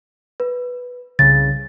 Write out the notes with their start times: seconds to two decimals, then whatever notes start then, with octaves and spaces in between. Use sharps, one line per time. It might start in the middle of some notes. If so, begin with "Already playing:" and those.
0.40 B4
1.19 C2 C#3 A6